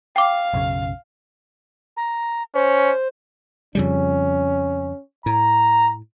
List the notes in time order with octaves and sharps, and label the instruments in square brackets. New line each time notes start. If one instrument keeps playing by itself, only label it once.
[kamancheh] F5 [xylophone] G5 D6
[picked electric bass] B1 F#2 C#3
[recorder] A#5
[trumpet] C#4 [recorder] C5
[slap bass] F2 C#3 G3 [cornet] C#4
[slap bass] A2 [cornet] A#5